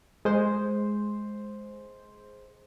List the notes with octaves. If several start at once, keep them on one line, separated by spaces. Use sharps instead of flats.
G#3 C5